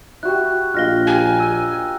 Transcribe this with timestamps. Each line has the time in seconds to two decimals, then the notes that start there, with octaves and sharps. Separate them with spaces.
0.23 E4 F#4 G4 F#6
0.75 A#1 F4 D#5 F5 F6 A#6 G7
1.07 G4 G#5 A#5
1.40 E6